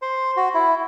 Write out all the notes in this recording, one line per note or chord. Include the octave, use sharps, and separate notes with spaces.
C5
F#4
E4